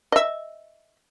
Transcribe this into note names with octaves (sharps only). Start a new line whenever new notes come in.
D#5 E5